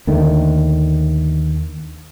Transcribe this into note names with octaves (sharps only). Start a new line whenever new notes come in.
D#2 D3 D#3 A3